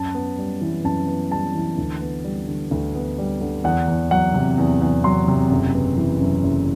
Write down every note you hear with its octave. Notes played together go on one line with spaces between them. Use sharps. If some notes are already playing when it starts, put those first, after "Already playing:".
Already playing: F#2 A5
B3
G3
E3
F#2 A5
B3
G3 A5
E3
D2
B3
G3
D3
D2
B3
G3
D3
E2 F#5
E2
F#3 F#5
C3
E2
E2
F#3 C6
C3
F#1
B3
E3
F#2
F#1